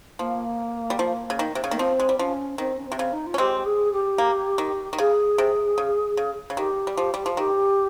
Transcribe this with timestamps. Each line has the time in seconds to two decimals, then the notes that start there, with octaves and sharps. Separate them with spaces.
0.19 F3 A#3
0.90 G3
0.99 F3
1.30 C#3
1.39 D#3
1.55 C3
1.64 C#3
1.71 D#3 A#3
1.78 F3 C4
2.00 G#3
2.09 G3
2.19 F3 C#4
2.58 D#3 C4
2.77 C#4
2.86 C4
2.92 C3
2.99 C#3
3.12 D#4
3.26 F4
3.34 C#4
3.38 G#3 C4 G4
3.65 G#4
3.92 G4
4.18 A#3
4.58 D#3
4.93 D#3
4.98 C#3 G#4
5.38 C3
5.78 C#3
6.17 C#3
6.50 C#3
6.57 D#3 G4
6.87 G3
6.97 F3
7.14 G3
7.26 F3
7.37 D#3 G4